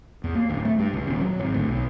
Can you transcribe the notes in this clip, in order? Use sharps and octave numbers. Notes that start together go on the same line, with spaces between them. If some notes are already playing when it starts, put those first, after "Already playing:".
E2
A#3
D1
A3
G2
C#2
D#1
F#3
G#1
D2
B1